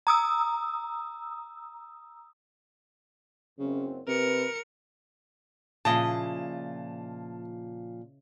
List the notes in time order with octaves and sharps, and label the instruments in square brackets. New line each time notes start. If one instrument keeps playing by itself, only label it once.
[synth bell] A#5 D#6 E6
[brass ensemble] F#1 F#2 C4 [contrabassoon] C#3
[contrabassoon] C3 [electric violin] A#4 C#7 [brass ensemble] B4
[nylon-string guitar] A#2 F3 [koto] C#3 E4 D#5 [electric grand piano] A5